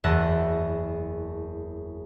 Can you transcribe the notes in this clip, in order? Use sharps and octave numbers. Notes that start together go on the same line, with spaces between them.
F#1 E2 E5 F#5 A5 A#6